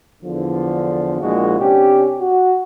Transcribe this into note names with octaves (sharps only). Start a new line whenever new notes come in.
E2 D3 F3
A#1 A#2 F3 G#3 E4 F#4
C3 C#4 D4 G4
F#4